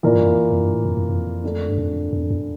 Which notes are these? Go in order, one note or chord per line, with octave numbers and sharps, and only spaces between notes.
A2 E3 A#3 F4 A#4 D5
G2
F2
F2
G2
A2
F2
F2
F2
D3 A3 D4
G2
F2
E2
F2
E2